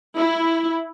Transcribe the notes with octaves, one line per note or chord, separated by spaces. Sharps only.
E4